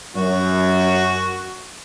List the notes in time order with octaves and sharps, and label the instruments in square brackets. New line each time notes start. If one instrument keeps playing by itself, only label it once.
[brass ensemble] F#2 [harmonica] F#4